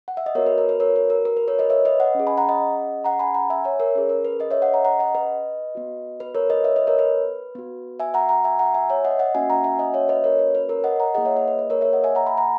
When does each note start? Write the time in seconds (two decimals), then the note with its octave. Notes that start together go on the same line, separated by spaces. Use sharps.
0.08 F#5
0.17 E5
0.26 D#5
0.35 B3 F#4 A#4 C#5
0.46 B4
0.58 A#4
0.69 B4
0.80 A#4 C#5
0.96 B4
1.10 A#4
1.25 A#4
1.37 B4
1.48 A#4 C#5
1.59 B4 D#5
1.70 C#5 E5
1.85 B4 D#5
2.00 D#5 F#5
2.15 C#4 G#4
2.27 G#5 B5
2.38 F#5 A#5
2.49 D#5 F#5
3.04 F#5 A#5
3.19 G#5 B5
3.34 F#5 A#5
3.50 E5 G#5
3.64 C#5 E5
3.80 A#4 C#5
3.95 C#4 G#4 B4
4.09 A#4
4.25 B4
4.40 B4 D#5
4.51 C#5 E5
4.62 D#5 F#5
4.74 F#5 A#5
4.85 F#5 A#5
4.99 D#5 F#5
5.15 B4 D#5
5.75 B3 F#4
6.20 B4
6.35 A#4 C#5
6.50 B4 D#5
6.64 C#5 E5
6.76 B4 D#5
6.87 A#4 C#5
6.99 B4
7.55 B3 F#4
8.00 E5 G#5
8.14 F#5 A#5
8.29 F#5 A#5
8.44 E5 G#5
8.59 F#5 A#5
8.74 E5 G#5
8.90 C#5 E5
9.05 D#5 F#5
9.19 D#5 F#5
9.35 A#3 C#4 F#4 E5 G#5
9.50 F#5 A#5
9.64 E5 G#5
9.79 D#5 F#5
9.94 C#5 E5
10.09 B4 D#5
10.24 A#4 C#5
10.39 B4
10.55 B4
10.69 A#4 C#5
10.84 D#5 F#5
11.00 F#5 A#5
11.14 A#3 E4 G#4 D#5 F#5
11.25 C#5 E5
11.36 B4 D#5
11.48 B4
11.59 B4
11.70 A#4 C#5
11.81 C#5 E5
11.93 D#5 F#5
12.04 E5 G#5
12.15 F#5 A#5
12.27 G#5 B5
12.38 F#5 A#5